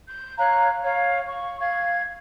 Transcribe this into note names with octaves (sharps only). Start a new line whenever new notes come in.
G6
C#5 F5 A#5 F#6
C#5 F5
C#6
F5 G#6